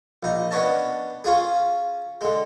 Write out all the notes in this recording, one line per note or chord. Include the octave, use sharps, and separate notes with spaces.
A#1 D#4
B3 C#4 D4 C#5 D#5 A5
C#4 F4 G#4
D3 G#3